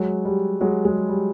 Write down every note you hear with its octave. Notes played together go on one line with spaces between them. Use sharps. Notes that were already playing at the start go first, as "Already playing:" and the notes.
Already playing: F#3 G#3
G3
F#3 G#3
F#3 G#3
G3